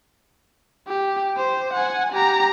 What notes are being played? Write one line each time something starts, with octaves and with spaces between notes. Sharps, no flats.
G4
C5
F#5 G#5
G4 A#5